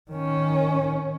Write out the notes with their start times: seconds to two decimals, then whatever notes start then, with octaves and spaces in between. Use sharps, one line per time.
0.11 D#3 C#4